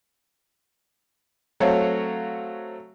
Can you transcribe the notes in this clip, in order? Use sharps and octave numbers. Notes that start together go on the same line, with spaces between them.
F#3 A3 C4 C#5 F5